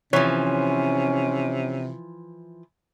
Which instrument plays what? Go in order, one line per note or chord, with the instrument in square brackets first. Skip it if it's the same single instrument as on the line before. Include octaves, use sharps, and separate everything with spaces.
[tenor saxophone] C3 [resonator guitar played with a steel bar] E3 F3 [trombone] C#4 [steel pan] C#5